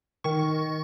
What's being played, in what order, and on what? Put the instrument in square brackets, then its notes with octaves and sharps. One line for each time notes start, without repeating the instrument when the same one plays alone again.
[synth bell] D#3 C#6